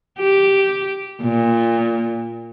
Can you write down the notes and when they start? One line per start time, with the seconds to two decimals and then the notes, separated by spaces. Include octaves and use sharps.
0.20 G4
1.22 A#2